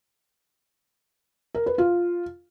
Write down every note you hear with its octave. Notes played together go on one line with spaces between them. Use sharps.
A#4
B4
F4